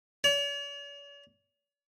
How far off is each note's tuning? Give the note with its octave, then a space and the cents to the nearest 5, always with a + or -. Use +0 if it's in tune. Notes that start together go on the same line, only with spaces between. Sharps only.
C#5 +45